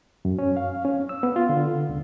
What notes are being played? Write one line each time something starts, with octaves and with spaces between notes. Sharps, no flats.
F#2
C#4
F5
C#4
E6
B3
F4
D3
C#2